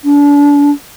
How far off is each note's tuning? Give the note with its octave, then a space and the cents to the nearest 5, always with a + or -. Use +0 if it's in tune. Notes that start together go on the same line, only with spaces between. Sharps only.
D4 -35